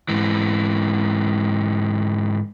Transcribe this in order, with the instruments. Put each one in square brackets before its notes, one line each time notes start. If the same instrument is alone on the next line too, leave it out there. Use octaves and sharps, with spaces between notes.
[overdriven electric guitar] G#2 E3